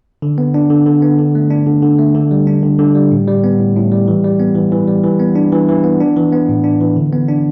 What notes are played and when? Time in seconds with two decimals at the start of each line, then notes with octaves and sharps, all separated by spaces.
0.22 D3
0.38 B3
0.54 D4
0.70 D3
0.86 D3
1.02 B3
1.19 D3
1.35 A3
1.50 D4
1.67 D3
1.83 D3
1.99 A3
2.15 D3
2.31 G3
2.47 D4
2.63 D3
2.79 D3
2.95 G3
3.11 A2
3.27 G3
3.44 B3
3.59 A2
3.76 A2
3.92 G3
4.08 E3
4.24 G3
4.40 B3
4.55 E3
4.72 E3
4.87 G3
5.04 E3
5.20 B3
5.35 D4
5.52 E3
5.69 E3
5.84 B3
6.00 D4
6.16 E3
6.33 B3
6.49 A2
6.64 D4
6.81 E3
6.96 D3
7.12 B3
7.29 D4